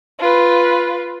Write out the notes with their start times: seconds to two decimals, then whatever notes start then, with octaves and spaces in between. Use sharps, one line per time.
0.19 F4 B4